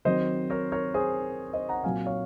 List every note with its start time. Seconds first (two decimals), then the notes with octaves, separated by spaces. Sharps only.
0.05 D#3 F#3 C4 C5 D#5
0.50 A#4 C#5
0.72 A#4 C#5
0.94 G#4 C5
1.53 C5 D#5
1.69 F#5 A#5
1.84 A#2 F#3 C4 F5 G#5
2.06 C#5 F5